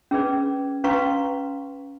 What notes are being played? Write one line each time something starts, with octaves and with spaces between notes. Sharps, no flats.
C#4 G#4 B4 D5
C#4 B4 F5 A#5 C6 C#6